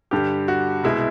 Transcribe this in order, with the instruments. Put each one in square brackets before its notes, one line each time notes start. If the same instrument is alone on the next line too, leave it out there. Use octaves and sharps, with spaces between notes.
[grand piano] G2 D3 G3 G4
F#4
C2 B2 G#3 E4